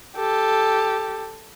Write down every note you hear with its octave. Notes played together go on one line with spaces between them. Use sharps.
G4 A4